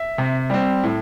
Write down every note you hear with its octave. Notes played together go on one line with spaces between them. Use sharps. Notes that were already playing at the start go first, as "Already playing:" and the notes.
Already playing: E5
C3
G3 C4
A2